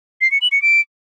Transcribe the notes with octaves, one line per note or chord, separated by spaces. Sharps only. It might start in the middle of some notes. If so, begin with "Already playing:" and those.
C7
C#7
F#7
C#7
D7